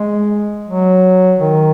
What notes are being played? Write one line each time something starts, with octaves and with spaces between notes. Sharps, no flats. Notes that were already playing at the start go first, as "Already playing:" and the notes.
Already playing: G#3
F#3
D#3